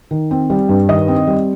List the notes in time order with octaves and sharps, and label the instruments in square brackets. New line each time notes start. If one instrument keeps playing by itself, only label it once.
[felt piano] D#3
C4
G3
G2
D#3 D#5
C4
G3